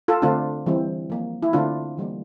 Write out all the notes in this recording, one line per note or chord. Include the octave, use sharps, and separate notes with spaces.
F4 A4
D3 A3 C4 D4 F4
E3 G3 C4
F3 A#3
E4
D3 A3 C4 D4 F4
E3 G3 A#3